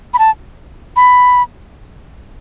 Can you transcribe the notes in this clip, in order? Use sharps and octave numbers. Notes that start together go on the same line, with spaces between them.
B5
A5
B5